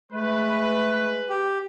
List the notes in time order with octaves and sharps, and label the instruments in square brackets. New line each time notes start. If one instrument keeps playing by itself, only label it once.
[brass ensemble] G#3 B4 [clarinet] A3
[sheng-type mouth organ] G4